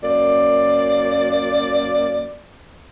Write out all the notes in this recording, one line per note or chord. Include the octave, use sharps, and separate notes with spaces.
F#2 A#3 D5